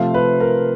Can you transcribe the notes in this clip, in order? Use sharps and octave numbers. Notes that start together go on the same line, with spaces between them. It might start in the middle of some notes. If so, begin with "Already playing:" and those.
Already playing: C3 F3 A3 C4 F5
B4
A#4